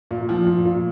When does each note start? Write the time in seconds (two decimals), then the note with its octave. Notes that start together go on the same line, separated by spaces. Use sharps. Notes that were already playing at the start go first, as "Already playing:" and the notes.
0.11 A#2
0.29 F3
0.46 A#2
0.65 A#2